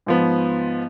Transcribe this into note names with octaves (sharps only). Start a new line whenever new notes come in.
G#2 F3 B3